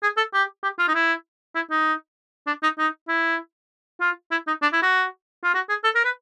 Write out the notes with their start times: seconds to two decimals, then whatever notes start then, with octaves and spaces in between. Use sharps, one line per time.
0.03 G#4
0.17 A4
0.34 G4
0.63 G4
0.79 F4
0.88 D#4
0.94 E4
1.55 E4
1.71 D#4
2.47 D4
2.63 D#4
2.78 D#4
3.08 E4
4.01 F4
4.31 E4
4.47 D#4
4.62 D4
4.73 E4
4.83 F#4
5.43 F4
5.54 F#4
5.69 G#4
5.84 A4
5.95 A#4
6.04 B4